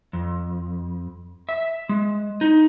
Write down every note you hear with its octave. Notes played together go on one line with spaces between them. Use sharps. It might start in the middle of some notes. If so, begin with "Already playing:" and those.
F2
E5
G#3
D#4